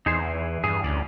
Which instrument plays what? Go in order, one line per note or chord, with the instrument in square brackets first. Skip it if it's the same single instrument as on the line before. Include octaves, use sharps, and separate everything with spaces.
[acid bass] E2 [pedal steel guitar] D#4 G#4 C5
[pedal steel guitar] E3
[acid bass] G2 [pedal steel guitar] E3 G#4
[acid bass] D2 [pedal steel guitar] C#4 D5